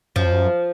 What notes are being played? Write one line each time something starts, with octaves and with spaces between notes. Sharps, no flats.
F#2 F3
F2
F#2